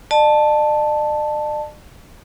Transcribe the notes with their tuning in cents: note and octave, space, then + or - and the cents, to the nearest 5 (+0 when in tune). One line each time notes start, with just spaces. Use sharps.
D5 +45 A5 +0